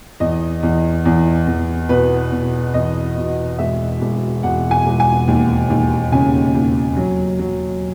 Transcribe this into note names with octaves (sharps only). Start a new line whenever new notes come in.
E2 D#5
E2
E2
E2
B2 B4
B2
E2 D#5
B2
E1 E5
E1
E1 F#5
G#5
E1
G#5
D#2
D#2
C#3 G#5
D#2
F#3
F#3